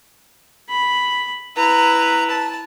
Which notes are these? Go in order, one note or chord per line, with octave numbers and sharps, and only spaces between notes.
B5
E4 B4 A#5
A5